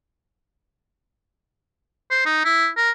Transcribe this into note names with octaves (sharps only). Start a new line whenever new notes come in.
C5
D#4
E4
A#4